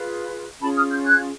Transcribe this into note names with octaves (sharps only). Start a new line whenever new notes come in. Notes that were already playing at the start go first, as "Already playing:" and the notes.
Already playing: F4 G#4 B4
C#4 F4 G#4 A5 B5
D#6 F6
F6 G6
F#6 G#6